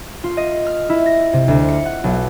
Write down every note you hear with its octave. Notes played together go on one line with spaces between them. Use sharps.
F4
D#5
F6
E4
A#6
C3
D2
C#7
F#5
B1